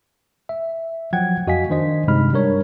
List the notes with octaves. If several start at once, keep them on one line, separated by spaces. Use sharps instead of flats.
E5
F3 F#3 F#5 G5 G#6
F2 F#4 D#5 F5 G#5 B6
D#3 D4 C5 D#5 B6
G2 C3 G#3 D#4 B5 F6
G3 D4 A#4 C#5